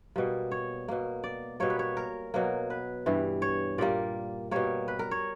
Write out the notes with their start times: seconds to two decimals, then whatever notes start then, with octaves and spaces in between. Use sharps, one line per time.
0.16 B2 G3 A#3
0.51 C#5
0.88 B2 A#3
1.24 D5
1.60 B2 G3 A#3 C#5
1.70 B4
1.79 C#5
1.97 A#4
2.34 B2 F#3 A#3
2.70 B4
3.06 G2 E3 G3
3.42 C#5
3.78 A#2 G3 A#3 D5
4.51 B2 G3 A#3 C#5
4.88 B4
4.99 A#4
5.11 C#5